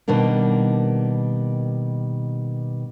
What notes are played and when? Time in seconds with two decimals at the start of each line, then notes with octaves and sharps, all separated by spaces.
0.08 B2 D#3 G3 A#3 D4